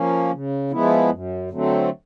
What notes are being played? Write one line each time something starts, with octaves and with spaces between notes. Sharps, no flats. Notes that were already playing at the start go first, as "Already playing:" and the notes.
Already playing: F3 A#3 C#4
C#3
F3 G#3 B3 E4
F#2
D3 F#3 A3 C4